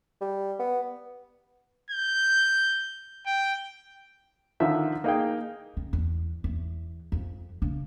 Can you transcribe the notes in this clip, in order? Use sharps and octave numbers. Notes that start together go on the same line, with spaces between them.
G3
B3
G6
G5
D3 D#3 F3 E5
A#3 D#4 G#4 G5
C#3
E2
E2
F2
C#3 D4